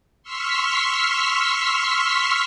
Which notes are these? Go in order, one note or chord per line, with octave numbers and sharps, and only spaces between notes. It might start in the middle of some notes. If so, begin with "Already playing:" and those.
C6 C#6 E6 F6 B6